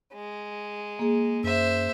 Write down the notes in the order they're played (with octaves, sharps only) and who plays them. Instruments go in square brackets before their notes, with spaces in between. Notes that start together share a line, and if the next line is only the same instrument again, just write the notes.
[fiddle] G#3
[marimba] A#3 G#4
[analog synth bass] F#2 [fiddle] C5 E5